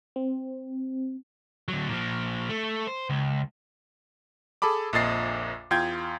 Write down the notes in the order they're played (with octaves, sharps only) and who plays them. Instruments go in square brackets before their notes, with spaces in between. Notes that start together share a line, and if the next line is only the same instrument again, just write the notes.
[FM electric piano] C4
[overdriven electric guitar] D2 F#3
A#2 F3
A3
C5
C#2
[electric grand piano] G#4 A4 A5 B5 D6
A#1 F2 A#2 D#5 A6 C7
E2 F4 G5 G6 G#6